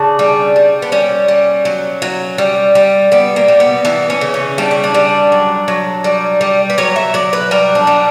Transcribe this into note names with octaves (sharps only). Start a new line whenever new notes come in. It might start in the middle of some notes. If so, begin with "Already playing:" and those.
Already playing: C#3 D4
G3
G3
B3
G3 C#4
G3
F#3
F#3
G3
G3
G3 B3
A#3
G3
B3
E3 B3
C#4
C#3
C#4
G3 D4
E4
D4
G3
F#3
F#3
G3
G3
B4
F#3 C#5
E5
F#3 D5
B4
G3 A#4
D4
G3